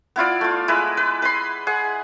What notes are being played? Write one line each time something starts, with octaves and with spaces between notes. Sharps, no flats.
B3 E4 F4 D5
A3 F4
G#3 E4 B4
B4
B4 B5 C6
G#4 F#5